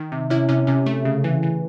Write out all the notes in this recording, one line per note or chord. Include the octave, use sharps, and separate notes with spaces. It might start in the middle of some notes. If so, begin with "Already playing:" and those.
Already playing: D#3
C3
C3 C#4 E4
C3 C#4
C3 C#4
A3
C#3
E3
E3